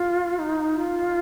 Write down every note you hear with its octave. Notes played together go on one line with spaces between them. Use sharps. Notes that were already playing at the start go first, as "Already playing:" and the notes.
Already playing: F4
D#4
F4